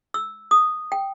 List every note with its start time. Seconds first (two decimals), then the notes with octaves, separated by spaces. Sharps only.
0.14 E6
0.51 D#6
0.92 G5